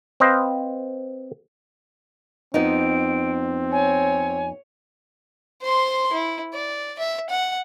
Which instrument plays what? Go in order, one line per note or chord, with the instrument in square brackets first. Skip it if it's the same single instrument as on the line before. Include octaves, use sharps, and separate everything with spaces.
[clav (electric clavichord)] C4 B4 C5 D#5 F5
[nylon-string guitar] F2 B3 D#4 [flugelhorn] C4 [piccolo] D7
[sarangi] C#5 [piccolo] G#5
[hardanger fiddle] C5 C6
E4
D5
E5
F#5